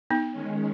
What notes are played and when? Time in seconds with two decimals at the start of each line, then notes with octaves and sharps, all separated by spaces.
0.10 B3 D#4
0.32 D#3 G#3 C#4